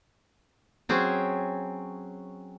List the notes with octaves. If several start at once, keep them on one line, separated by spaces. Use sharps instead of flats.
F#3 C4 C#4 G#4